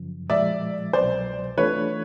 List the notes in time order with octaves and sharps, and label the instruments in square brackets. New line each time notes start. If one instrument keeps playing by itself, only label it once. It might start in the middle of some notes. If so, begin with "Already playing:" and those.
Already playing: [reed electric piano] F#2 C#3 F3
[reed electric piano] A#2 F3 G#3 [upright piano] D5 E5
[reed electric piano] C2 B2 F#3 [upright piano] C5 D5
[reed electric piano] E3 A3 D4 F4 A4 [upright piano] B4 C#5